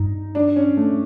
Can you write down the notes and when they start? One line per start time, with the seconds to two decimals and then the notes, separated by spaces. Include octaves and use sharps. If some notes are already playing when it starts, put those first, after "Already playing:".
Already playing: G2 D#4
0.35 D4
0.56 C#4
0.77 A3